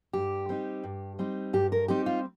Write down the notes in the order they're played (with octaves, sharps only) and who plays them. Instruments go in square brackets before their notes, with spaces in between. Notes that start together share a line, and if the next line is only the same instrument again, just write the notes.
[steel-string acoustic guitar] G2 G4
G3 C4 D#4
G2
G3 C4 D#4
G2 G4
A#4
G3 C4 D#4 G4
F4